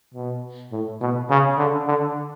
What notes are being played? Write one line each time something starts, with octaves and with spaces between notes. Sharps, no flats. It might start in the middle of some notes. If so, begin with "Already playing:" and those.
B2
A2
B2
C#3
D3
D3